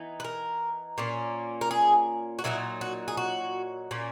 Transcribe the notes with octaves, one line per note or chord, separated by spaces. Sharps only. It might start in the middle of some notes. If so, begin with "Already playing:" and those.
Already playing: E3 B3 D#4
B4
A#4
A#2 A#3 C#4
A#4
G#4
F#4
A#2 F#3 B3 D#4 E4
F#4
G#4
F#4
A#2 A#3 C#4